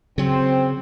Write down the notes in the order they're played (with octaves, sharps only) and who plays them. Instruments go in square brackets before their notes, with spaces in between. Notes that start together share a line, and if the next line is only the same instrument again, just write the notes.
[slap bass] C#3 F#3 [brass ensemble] C4